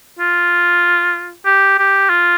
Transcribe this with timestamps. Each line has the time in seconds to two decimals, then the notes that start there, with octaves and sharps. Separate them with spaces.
0.19 F4
1.46 G4
1.78 G4
2.09 F4